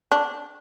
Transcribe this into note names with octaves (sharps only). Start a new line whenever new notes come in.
D4